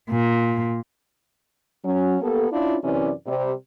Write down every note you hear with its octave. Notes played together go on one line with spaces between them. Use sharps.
A#2
F#3 C#4
A#3 B3 G4 A4
C#4 D4 E4 F4
F#2 C3 E3 C#4 E4 D5
C3 G3